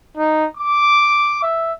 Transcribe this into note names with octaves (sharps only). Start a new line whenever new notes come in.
D#4
D6
E5